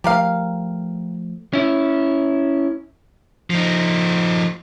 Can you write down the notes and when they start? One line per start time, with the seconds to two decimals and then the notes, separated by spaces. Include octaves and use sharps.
0.04 F3 A3 G4 A#4 F5
1.53 C#4 E4
3.50 F3 D#4